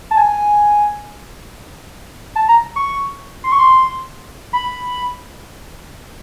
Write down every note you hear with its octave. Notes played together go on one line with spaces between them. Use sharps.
A5
G#5
A5
A#5
C#6
C6
C#6
C6
B5